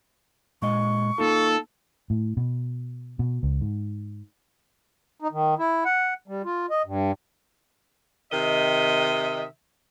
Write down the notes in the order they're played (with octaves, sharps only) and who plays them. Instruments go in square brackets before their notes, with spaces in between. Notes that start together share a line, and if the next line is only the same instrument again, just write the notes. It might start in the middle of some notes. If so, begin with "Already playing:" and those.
[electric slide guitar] A#2 G#3 D#5 [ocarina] C#6
[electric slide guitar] A#3 D#4 F4 [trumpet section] A4
[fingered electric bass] A2
B2
B2
C#2
G#2
[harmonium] D#4
D#3
E4
F#5
G3
F4
D#5
G2
[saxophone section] C3 D#3 D#5 E5